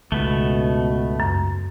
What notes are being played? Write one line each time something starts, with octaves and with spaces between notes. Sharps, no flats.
C#2 G#2 B2 A3 B3
F#2